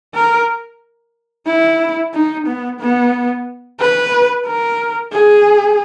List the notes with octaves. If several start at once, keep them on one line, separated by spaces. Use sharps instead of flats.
A#4
E4
D#4
B3
B3
B4
A#4
G#4